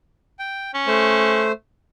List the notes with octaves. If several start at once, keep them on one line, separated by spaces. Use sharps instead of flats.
G5
C#4
A3 C5